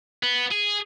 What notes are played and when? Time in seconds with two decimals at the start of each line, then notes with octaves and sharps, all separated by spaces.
0.23 B3
0.51 G#4